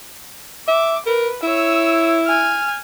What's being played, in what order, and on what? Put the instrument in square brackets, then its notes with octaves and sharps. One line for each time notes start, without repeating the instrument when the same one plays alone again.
[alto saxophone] E5 [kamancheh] D6
[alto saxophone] A#4 [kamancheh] B4
[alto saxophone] E4 [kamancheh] C#5 E6
[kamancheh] G#5 F6